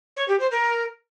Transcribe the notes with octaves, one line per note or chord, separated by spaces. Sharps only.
C#5
G4
C5
A#4